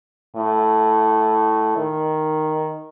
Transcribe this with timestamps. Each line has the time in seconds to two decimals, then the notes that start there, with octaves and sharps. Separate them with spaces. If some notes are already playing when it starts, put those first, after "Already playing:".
0.36 A2
1.77 D#3